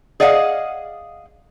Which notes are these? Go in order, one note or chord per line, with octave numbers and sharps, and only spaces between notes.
G#4 D5 D#5 F5 F#5